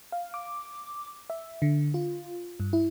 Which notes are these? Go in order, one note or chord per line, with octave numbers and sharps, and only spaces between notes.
F5
D6
E5
D3
F4
G2
E4